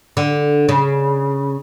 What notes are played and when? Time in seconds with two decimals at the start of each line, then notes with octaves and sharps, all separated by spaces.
0.17 D3
0.69 C#3